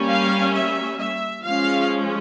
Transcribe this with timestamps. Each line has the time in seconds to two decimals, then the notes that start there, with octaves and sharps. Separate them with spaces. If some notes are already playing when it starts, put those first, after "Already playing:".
Already playing: G3 A#3 C#4
0.08 F5
0.55 E5
1.00 E5
1.44 F3 G#3 C#4 F5